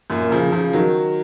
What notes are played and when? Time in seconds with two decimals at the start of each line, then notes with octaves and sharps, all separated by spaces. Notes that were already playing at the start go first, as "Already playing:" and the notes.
0.10 F#2 A#2
0.31 C#3 F3
0.52 C#3 F3
0.73 D#3 F#3